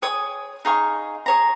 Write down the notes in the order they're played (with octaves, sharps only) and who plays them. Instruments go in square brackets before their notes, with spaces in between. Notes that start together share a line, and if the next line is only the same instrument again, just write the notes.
[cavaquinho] G#4 C#5 G#5 D#6
D#4 G#4 F5 C#6
G#4 C#5 A#5